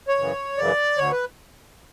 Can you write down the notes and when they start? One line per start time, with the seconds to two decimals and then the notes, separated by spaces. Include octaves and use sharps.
0.08 C#5
0.18 F#2 C#3 E3
0.57 F#2 C#3 E3 D5
0.98 D2 D3 C#5
1.11 B4